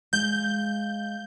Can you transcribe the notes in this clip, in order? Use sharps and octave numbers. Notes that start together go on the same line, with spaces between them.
G#3 F5 G6